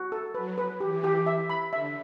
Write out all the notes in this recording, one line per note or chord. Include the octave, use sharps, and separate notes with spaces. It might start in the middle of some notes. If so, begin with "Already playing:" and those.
Already playing: F#4
A4
F#3 B4
B4
E3 G4
G4
E5
B5
D3 E5